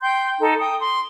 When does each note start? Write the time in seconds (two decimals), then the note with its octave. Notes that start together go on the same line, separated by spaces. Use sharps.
0.01 G5 C6 G6
0.39 D#4 A4
0.59 G5 D#6
0.79 C6